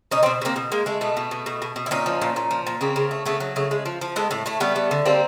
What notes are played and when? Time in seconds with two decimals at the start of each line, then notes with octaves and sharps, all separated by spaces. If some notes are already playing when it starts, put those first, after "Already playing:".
0.11 B2 C#4 D#4
0.23 C4 D4
0.26 B2
0.42 B2
0.45 A#3 C4
0.56 B2
0.72 G#3 A#3
0.86 G#3 A3
1.01 B2 A3 B3
1.17 B2
1.31 B2
1.46 B2
1.62 B2
1.76 B2
1.86 E4
1.91 A#2 C#4 D#4
2.06 F3
2.22 A#2
2.36 A#2
2.51 F3
2.67 A#2
2.81 C#3 A#3 C4
2.96 C#3
3.11 A3
3.25 C#3 A3 B3
3.40 F#3
3.56 C#3 A3
3.71 G#3
3.86 F3
4.01 F3
4.16 G#3 A3 B3
4.31 A2 A3
4.46 A2 A3
4.60 G3 A3 B3
4.76 G3
4.91 D3
5.05 G3 A#3 C4